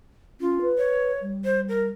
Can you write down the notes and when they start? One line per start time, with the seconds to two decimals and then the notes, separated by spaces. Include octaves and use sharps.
0.40 C#4 F4
0.61 B4
0.78 C#5
1.22 G3
1.44 C5
1.69 A#4